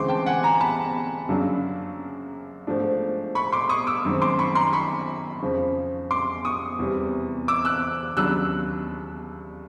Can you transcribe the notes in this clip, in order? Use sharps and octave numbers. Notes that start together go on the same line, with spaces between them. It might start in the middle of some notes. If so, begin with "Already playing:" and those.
Already playing: D2 C#3 E3 G#3 C4 C6 D6
G5 A5
F#5 G#5
G#5 A#5
A5 B5
F#2 C#3 F#3 A#3 D4
G#2 F3 A3 D4
B5 C#6
C6 D6
C#6 D#6
D6 E6
F#2 D#3 G#3 C4
C6 D6
B5 C#6
A#5 C6
B5 C#6
F2 C#3 F3
C6 D6
C#6 D#6
E2 C3 E3 G3
D6 E6
E6 F#6
D#2 C#3 F#3 B3 D4 E6 F#6